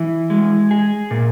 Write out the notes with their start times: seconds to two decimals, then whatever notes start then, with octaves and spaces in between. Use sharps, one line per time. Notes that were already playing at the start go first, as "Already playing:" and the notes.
Already playing: E3
0.30 G#3
0.71 G#4
1.11 A#2